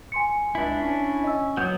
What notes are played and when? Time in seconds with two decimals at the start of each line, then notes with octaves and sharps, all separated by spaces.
0.12 G#5 C6 C#7
0.55 C#2 D4 E4
0.80 C#4
1.23 D#5 E6
1.57 F#3 B3 G6